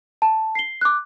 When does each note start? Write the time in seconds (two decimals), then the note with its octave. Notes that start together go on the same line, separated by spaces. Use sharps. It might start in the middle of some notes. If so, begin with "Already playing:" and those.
0.22 A5
0.55 C7 G7
0.81 D6 F#6